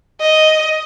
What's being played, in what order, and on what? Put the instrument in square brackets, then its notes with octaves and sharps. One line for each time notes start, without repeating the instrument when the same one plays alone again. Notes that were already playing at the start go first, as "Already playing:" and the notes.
[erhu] D#5